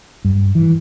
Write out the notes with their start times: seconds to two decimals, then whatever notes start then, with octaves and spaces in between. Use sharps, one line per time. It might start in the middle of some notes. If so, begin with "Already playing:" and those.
0.25 G2
0.55 E3